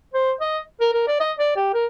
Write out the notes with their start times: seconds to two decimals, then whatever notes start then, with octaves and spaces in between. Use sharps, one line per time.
0.14 C5
0.40 D#5
0.81 A#4
0.93 A#4
1.08 D5
1.20 D#5
1.39 D5
1.56 G4
1.74 A#4